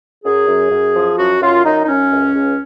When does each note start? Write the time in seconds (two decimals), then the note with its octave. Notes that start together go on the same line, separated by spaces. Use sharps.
0.25 F#2 G#4
0.48 F#2
0.71 F#2
0.95 F3
1.18 F#2 F#4
1.41 F#2 F4
1.64 F#2 D#4
1.84 D#4
1.88 F#2 C#4
2.12 C#2
2.35 C#2